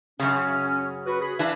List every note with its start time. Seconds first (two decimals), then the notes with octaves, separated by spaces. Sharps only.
0.20 F#2 C#3 C#4
1.06 F#4 B4
1.21 G#4 B5
1.39 E3 D4 E5 F5